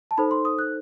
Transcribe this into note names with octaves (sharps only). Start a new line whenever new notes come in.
A5
D#4 A4 C5 B5
C6
D#6
F#6